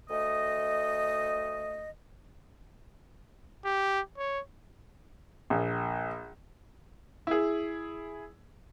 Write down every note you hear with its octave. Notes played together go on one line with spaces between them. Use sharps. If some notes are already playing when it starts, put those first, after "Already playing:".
D2 A3 D#5
G4
C#5
A#1
E4 G#4